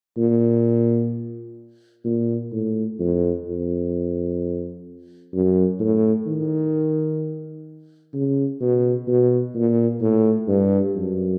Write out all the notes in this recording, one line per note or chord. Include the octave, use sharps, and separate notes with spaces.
A#2
A#2
A2
F2
F2
F#2
A2
D#3
C#3
B2
B2
A#2
A2
G2
F#2